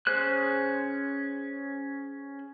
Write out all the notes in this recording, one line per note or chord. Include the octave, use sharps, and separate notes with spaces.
C#4 G#4 C5 F#6